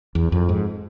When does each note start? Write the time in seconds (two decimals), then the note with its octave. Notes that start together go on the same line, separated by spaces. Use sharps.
0.15 E2
0.32 F2
0.49 G#2